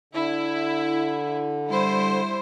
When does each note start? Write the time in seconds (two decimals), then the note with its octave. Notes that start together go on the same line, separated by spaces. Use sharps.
0.13 D3 E4
1.67 G3 E4 C5